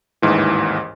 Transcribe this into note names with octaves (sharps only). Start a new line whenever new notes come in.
A1 D#2 G#2 E3